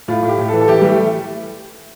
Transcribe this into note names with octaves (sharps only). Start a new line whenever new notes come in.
A2 F4
A2
G4
A2
A4
E3
A4
E3 G4
E3 G3
A3